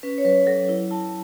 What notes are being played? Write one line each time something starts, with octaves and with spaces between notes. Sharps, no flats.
C#4 B4
C#5
F#3 B4
F#3 A4
E4
E4 A5